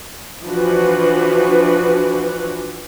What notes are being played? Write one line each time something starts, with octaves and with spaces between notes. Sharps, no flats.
E3 F3 D4 F#4 B4